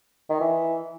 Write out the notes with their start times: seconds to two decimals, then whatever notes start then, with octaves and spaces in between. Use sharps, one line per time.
0.30 D#3
0.41 E3